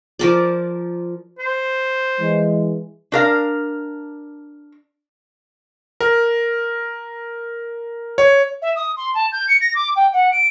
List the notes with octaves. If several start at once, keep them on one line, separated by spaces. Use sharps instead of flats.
F3 A#4 D5
C5
E3 G#3
D4 A#4 F5
A#4
C#5
E5
D#6
C6
A5
G6
C#7
A#6
D6
G5
F#5
D7